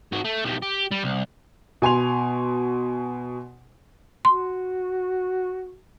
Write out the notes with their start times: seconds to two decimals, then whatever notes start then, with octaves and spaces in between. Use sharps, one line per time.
0.12 G#2 F#4
0.24 A3
0.45 B1 G3
0.62 G4
0.91 G3
1.04 C2
1.82 B2 G#5 C6 F7
4.25 F#4 C6